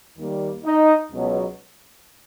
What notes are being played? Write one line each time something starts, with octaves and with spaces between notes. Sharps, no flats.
D#2 D#3 G3 A#3
D#4 D#5
C#2 B2 F#3